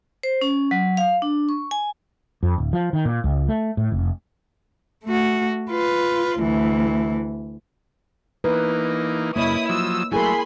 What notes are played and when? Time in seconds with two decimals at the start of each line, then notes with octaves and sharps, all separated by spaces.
0.23 C5
0.41 C#4
0.71 F#3
0.97 F5
1.22 D4
1.49 C#6
1.71 G#5
2.43 F2
2.58 D1
2.73 F3
2.93 D#3
3.05 A#2
3.24 C#2
3.48 A3
3.77 A2
3.92 F1
5.05 A3 F#4
5.71 F4 B4
6.40 D2 E3
8.44 E3 A#3 D#4 B4
9.36 F#2 C#3 A#3 E4 C#5 D#5 D#6
9.69 F3 F#3 D#6 E6
10.12 F#3 A3 E4 G#4 A#4 G#5 B5 C6